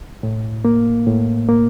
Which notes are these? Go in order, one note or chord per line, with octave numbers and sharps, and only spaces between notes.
A2
A#3
A2
A#3